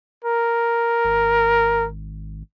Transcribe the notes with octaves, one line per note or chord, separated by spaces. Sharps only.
A#4
G#1